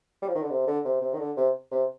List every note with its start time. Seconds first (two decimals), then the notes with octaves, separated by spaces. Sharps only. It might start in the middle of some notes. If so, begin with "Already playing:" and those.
0.22 G3
0.28 F3
0.35 D#3
0.42 D3
0.50 C3
0.67 D3
0.85 C3
1.01 C3
1.14 D#3
1.19 D3
1.37 C3
1.71 C3